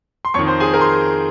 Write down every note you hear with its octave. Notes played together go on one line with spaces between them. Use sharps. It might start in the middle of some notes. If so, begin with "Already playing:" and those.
C6
F2 D#3 C#5 C#6
C5 C6
G#4 G#5
A#4 A#5
C6